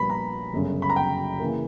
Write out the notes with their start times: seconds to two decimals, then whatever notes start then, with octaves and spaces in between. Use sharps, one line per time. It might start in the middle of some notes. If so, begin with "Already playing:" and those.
Already playing: A#1 A#2 G3 B3 B5
0.10 A#5
0.53 G1 F#2 C#3
0.82 B5
0.90 A#5
0.96 G5
1.40 C#3 E3 A#3